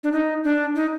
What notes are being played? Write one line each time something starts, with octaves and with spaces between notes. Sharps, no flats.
D4
D#4
D4
D#4